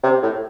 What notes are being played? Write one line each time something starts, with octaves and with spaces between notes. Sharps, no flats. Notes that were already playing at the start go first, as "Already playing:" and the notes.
C3
A2